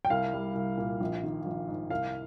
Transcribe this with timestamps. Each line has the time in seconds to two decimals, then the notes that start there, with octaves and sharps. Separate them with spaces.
0.05 G5
0.10 C2 F5
0.33 G3
0.55 C2
0.78 A#2
1.00 A#1
1.23 D#3
1.46 A#1
1.68 G#2
1.90 C2 F5